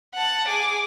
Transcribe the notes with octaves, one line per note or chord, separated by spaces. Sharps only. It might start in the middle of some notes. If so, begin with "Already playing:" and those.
F#5 A5
G#4 D6